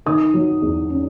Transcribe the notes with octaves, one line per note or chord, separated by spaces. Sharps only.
D#3 D#6
F#3
E2
C#4